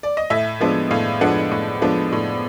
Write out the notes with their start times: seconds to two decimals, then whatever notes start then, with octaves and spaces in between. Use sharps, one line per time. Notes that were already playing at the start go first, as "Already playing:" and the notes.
0.03 D5
0.17 D#5
0.30 A2 E5
0.60 F3 G#3 B3 D4
0.91 A2 F5
1.21 F3 G#3 B3 D4 F#5
1.52 A2
1.82 F3 G#3 B3 D4
2.12 A2